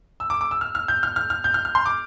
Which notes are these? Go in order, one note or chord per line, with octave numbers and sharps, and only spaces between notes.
E6
D6
D6
E6
F6
F6
G6
F6
F6
F6
G6
F6
F6
C6
D6